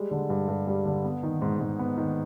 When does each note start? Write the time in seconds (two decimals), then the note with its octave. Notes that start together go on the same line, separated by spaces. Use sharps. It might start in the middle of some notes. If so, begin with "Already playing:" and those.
Already playing: G3 G#3
0.11 D3
0.30 G2
0.48 G2
0.67 G3
0.86 D3
1.05 B3
1.23 D#3
1.42 G#2
1.60 G#2
1.79 B3
1.97 D#3